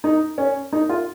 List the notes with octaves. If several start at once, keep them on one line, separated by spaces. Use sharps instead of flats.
D#4
C#4
D#4
F4